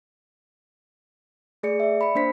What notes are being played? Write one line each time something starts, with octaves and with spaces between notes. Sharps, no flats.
A3 G#4 D5 C#7
D5 E5
B5 C#7
A#3 D4 C5 B6